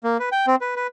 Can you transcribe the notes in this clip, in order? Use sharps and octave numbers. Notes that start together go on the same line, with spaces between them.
A#3
B4
G5
C4
B4
B4